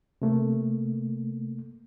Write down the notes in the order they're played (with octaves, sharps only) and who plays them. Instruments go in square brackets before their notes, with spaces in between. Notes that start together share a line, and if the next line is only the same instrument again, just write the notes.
[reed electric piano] C3 A3 A#3